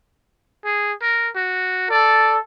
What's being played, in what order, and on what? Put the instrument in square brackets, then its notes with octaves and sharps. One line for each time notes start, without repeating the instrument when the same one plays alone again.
[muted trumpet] G#4
A#4
F#4
[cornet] A4 [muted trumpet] D5